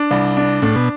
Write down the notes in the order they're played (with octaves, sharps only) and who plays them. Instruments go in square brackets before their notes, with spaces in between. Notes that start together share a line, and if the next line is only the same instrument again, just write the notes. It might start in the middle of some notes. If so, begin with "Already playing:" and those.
Already playing: [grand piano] D4
C2
D4
[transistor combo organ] A2 [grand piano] D4
[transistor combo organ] B2